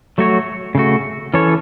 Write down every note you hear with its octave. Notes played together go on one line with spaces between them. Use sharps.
F#3 A3 F#4 C#5
C#3 A3 F#4
E3 C#4 A4 C#5